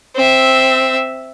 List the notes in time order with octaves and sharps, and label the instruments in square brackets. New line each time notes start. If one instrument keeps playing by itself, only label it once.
[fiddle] C4 E5